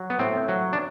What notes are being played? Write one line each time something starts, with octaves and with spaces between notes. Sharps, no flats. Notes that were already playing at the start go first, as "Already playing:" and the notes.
Already playing: F#3
B3
A2 C4
F#3
D4